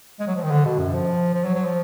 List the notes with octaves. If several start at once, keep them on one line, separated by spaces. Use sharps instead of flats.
G#3
F#3
F3
D#3
D3
B2
F#2
F3
F3
F#3
F#3
F3